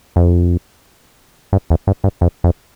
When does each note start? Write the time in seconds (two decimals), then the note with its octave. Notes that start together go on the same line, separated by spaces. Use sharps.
0.16 F2
1.53 G2
1.70 E2
1.87 G2
2.04 G2
2.21 F2
2.44 F2